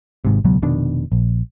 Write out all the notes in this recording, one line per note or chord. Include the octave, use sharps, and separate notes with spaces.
G#1 G#2 C3
E1 C#2 B2 F#3
F1 B2 D#3 D4
A#1